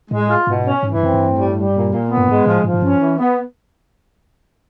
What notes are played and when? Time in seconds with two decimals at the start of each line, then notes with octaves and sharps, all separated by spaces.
0.11 A2 G#3
0.30 F4
0.47 G#2 B2
0.65 C#4
0.83 G#2 E3
0.94 G2
1.01 F#2 C4
1.14 G2
1.19 A2
1.37 G3
1.56 G3
1.73 A#2
1.91 A#2
2.09 B3
2.17 G2
2.28 G#2 G#3
2.45 A2 F3
2.63 G#2 F3
2.74 G#2
2.82 G2 C#4
3.00 E3
3.18 B3